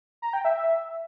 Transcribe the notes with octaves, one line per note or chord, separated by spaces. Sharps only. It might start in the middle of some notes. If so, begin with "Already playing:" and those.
A#5
G5
E5